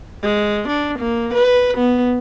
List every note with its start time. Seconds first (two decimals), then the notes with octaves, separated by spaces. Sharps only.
0.23 G#3
0.69 D4
0.99 A#3
1.34 B4
1.77 B3